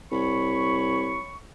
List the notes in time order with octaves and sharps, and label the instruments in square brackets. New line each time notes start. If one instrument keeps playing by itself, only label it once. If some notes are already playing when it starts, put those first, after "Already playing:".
[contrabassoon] C2 [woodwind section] C#5 B5 C#6